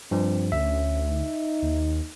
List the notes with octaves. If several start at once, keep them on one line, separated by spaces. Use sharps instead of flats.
G2 F3 C4
D2 C#4 E5
D#4
D#2